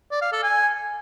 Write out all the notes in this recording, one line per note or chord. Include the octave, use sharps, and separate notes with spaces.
D5
F5
A4
G#5